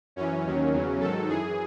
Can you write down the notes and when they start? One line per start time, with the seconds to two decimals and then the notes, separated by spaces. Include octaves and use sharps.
0.16 F#2 E3 C#4
0.45 D#2 D#3 F#3
0.72 E2 C#3 F#3
1.00 G#2 D#3 F#3 A4
1.29 F#2 E3 G#4